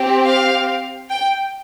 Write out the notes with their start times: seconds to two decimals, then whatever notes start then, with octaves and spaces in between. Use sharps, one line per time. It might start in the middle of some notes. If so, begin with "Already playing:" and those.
Already playing: C4 G4
0.27 F5
1.09 G5